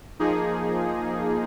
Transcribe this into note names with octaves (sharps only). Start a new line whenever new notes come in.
F3 A#3 D#4 G#4